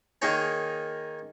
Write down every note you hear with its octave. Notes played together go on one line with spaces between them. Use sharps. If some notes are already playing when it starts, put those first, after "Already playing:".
D#3 A#3 D#4 G#4 C#5